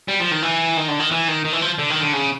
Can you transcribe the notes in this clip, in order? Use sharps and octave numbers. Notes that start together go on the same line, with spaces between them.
G3
F3
D#3
E3
D#3
D3
D#3
E3
D#3
D#3
E3
F3
D3
D#3
D3
C#3